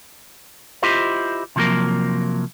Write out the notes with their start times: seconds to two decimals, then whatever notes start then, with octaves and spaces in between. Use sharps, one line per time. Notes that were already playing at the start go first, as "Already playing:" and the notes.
0.82 E4 F4 G4 C5 D#5
1.56 C3 F3 F#3 A#3 A#4